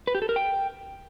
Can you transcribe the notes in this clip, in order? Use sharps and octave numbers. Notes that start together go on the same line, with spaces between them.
B4
G4
A4
A#4
G5